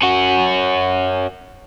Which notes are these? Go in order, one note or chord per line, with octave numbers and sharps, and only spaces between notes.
C#4 F#4